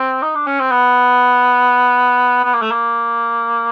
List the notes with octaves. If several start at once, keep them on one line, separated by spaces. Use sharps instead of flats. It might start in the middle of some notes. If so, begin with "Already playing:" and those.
Already playing: C4
D#4
D4
C#4
C4
B3
B3
A#3
A3
A#3